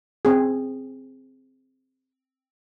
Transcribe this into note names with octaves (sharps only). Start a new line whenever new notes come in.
C4 G#4